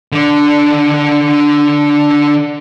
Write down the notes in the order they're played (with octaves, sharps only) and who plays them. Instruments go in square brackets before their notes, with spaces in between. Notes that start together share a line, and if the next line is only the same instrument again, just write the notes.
[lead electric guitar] D3 D4